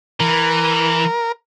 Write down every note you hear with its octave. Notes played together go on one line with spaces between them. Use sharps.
E3 A#4